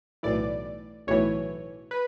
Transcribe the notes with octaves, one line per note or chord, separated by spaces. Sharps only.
B1 A2 E3 D5
B1 A2 E3 C#5
B4